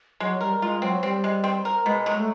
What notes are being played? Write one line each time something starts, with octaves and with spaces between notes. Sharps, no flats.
F#3 G#3
G3 A#4
G#3 F4
F#3 C4
G3 C4
G#3
C4
A#4
B2 G#3
F#3
A3